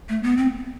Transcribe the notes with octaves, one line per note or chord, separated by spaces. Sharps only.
A3
B3
C4